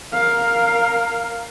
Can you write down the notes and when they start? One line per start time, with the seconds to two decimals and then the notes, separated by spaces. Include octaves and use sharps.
0.12 A#4 F5